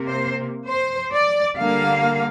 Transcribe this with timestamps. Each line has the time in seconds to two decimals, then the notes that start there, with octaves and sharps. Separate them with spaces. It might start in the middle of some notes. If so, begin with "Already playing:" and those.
Already playing: C3 A#3
0.08 C5
0.68 C5
1.12 D5
1.57 D3 G3 A#3 F5